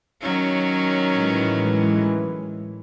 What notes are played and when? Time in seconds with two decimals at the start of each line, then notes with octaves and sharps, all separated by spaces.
0.22 D#3 F#3 C#4
1.14 A2 E3 G#3